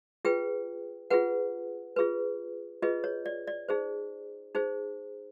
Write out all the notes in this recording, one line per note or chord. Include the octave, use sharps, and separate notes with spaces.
F4 G#4 B4 G5
F4 G#4 B4 F#5
F4 G#4 B4
F4 G#4 B4 D#5
C#5
D5
D5
D#4 G#4 C5
D#4 G#4 C5